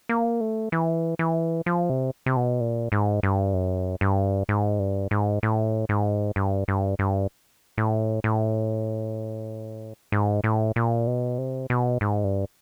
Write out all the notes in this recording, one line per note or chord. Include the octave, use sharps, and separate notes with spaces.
A#3
A3
E3
E3
F3
C3
C3
B2
A#2
G#2
G2
F#2
G2
G#2
G2
G#2
A2
G#2
G2
G2
G2
A2
A2
G#2
A2
A#2
B2
C3
B2
G#2
G2